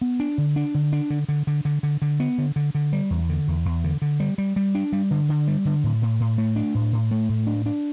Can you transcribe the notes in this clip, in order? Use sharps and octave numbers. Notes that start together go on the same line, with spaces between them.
B3
D4
D3
D4
D3
D4
D3
D3
D3
D3
D3
D3
B3
D3
D3
D3
G3
E2
D3
E2
E2
D3
D3
G3
G3
G3
D4
G3
D3
D3
G3
D3
A2
A2
A2
A3
D4
A2
A2
A3
A2
D4
D4